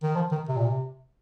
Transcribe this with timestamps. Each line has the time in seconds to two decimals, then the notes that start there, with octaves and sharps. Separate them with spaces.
0.03 D#3
0.15 F3
0.31 D#3
0.49 C3
0.56 A#2
0.66 C3